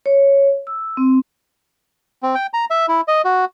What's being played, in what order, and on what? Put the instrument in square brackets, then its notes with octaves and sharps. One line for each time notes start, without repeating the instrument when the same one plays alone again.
[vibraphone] C#5
E6
C4
[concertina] C4
G5
A#5
E5
E4
D#5
F#4